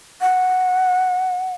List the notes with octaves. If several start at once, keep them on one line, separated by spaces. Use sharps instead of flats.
F#5